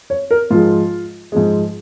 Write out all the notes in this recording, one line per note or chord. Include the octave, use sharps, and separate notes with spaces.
C#5
A#4
G#2 F3 G#3 F4
G#2 F3 G#3